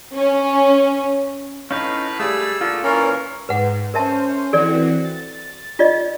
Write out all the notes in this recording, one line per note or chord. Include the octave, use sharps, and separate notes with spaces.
C#4
A2 C#4 D#4 B4 F5
G3 A3 G#4 E6
A#2 D3 A3 F4
A#2 E3 C#4 A#4 C#5
G#2 B4 F#5
C#4 A#4 C5 E5 A5
E3 C4 F#4 A4 D5
A6
F4 D5 D#5